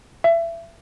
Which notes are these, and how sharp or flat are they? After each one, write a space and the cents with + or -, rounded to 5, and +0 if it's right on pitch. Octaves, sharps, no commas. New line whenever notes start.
E5 +25